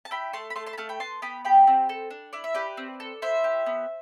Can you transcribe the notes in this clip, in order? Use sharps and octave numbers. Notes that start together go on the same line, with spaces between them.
A5
E4 G5 B5
A3 A5 C6
B5
A3 A5 C6
A5 C6
B5
A3 F5 A5
G5 B5
B3 A5 C6
B3 G5 B5
G4 G5 B5
C4
A4
D4
E4 D5
E5
G4 B4 D5
C4
A4
E4 C5 E5
G4
B3